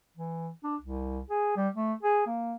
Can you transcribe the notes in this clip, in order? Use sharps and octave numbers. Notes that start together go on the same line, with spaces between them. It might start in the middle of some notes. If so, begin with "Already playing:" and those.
E3
D4
C2
G#4
G3
A3
G#4
A#3